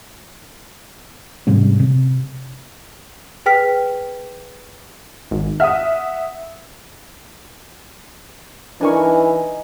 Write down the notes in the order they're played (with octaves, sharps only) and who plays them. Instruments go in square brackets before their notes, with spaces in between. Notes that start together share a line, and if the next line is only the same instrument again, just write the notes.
[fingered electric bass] G#2 C3 G3 C#4
C3
[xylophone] G#4 B4 G5 F6 B6
[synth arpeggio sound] G#1
[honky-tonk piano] E5 F#5 D#6 [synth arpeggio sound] F6
[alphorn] E3 [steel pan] D4 A#4 C#6 [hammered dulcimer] D#4 G#5